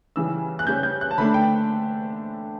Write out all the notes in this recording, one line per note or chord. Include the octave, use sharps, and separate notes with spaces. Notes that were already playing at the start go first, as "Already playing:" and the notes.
C#3 E3 G3 E6
F#6
C#3 G3 C#4 G6
G6
F#6
A5
D3 A3 D4 B5
G5